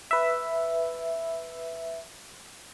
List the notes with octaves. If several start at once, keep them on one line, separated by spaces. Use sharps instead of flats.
B4 E5